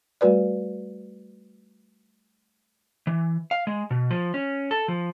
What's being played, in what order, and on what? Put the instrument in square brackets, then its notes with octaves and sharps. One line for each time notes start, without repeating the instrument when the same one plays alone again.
[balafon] G3 A3 F#4 B4 D5
[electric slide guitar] E3
F5
G#3
B2
F3
C#4
A4
F3